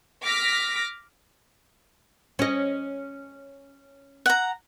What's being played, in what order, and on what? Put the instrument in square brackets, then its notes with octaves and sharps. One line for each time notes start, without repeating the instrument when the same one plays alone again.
[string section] D6 F6 A#6 B6
[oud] C#4 D#5
[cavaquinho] F#5 A#5